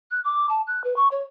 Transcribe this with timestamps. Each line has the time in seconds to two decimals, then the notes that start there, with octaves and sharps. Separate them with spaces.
0.11 F#6
0.25 D6
0.49 A5
0.67 F#6
0.84 B4
0.96 C#6
1.11 C#5